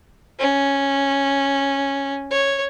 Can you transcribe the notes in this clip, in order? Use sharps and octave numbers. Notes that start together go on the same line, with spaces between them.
C#4
C#5